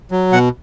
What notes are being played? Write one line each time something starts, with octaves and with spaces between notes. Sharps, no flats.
F#3
B2 F#5